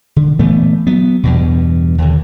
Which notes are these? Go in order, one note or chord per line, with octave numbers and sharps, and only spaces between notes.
D3
A#2 E3 A3 B3
F#3 B3
E2 G2 B2
D#2 D3